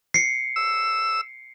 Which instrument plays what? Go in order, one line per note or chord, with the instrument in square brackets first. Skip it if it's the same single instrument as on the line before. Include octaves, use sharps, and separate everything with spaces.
[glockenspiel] C7 C#7
[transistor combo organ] E6